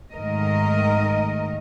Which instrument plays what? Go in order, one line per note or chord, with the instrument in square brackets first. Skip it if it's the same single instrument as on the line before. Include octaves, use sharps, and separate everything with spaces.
[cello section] G#2 D#3 A3 A#4 D#5